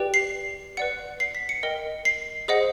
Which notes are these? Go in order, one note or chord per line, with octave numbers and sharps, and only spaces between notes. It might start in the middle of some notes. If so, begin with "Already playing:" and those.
Already playing: G4 B4 D5 G5
C7
B4 D5 F#5 C#7
C7
B6
C#7
A#4 D#5 G5
C7
G#4 C5 D#5 F#5